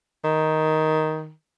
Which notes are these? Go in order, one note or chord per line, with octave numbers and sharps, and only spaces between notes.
D#3